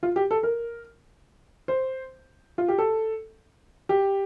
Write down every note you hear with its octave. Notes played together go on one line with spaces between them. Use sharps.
F4
G4
A4
A#4
C5
F4
G4
A4
G4